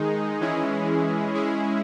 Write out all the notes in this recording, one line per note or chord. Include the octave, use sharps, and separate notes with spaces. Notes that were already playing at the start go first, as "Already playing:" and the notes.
Already playing: D#3 G#3 D#4 G#4
E3 G#3 C#4 E4 G#4
G#3 C#4 E4 G#4